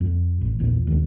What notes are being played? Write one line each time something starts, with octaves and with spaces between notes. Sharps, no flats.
F2
A1
A#1 E2 A#2
E1 D#2 C4